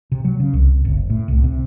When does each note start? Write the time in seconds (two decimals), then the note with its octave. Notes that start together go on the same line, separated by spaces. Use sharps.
0.12 C3
0.24 F#3
0.40 C#3
0.53 C2
0.85 F#1
1.10 A2
1.28 C2
1.44 C3